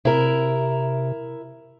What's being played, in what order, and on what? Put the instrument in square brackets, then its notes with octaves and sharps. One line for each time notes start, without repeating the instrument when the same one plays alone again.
[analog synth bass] C3 [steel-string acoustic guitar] E4 A#4